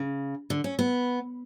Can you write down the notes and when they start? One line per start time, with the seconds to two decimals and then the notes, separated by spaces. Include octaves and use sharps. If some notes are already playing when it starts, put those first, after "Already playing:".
Already playing: C#3
0.50 D3
0.64 C#4
0.79 B3